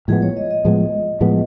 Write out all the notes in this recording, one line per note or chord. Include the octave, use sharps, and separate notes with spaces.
A2 F3 G#3 B3 G#4
C#5
D#5
D#5
A2 F3 G#3 B3
A2 F3 G#3 B3